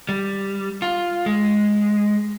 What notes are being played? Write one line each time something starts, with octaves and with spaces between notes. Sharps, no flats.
G3
F4
G#3